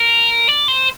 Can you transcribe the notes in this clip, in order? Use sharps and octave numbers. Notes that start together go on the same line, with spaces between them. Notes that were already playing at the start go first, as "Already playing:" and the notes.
Already playing: A#4
D5
C5